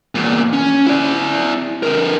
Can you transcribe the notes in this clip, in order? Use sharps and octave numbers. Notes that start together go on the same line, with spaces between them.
E2 A#2
C#4
E4 D5
D3 A#4